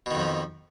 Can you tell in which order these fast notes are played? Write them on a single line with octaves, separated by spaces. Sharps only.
B2 D#3 F2 F3